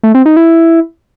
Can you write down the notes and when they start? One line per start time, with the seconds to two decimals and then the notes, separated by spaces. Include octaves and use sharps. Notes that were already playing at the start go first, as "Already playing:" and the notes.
0.03 A3
0.14 C4
0.26 D#4
0.37 E4